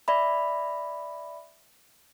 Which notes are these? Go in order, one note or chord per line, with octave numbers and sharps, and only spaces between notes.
D5 E5 B5